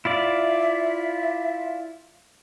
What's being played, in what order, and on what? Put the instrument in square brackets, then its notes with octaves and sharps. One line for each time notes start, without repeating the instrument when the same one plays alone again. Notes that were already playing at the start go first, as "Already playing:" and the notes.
[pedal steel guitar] E4 F4 D5 [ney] E5